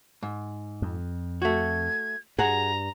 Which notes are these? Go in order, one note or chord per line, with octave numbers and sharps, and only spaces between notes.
G#2
F2
A3 F#4 G#6
G2 F#4 G#4 F#5 A#5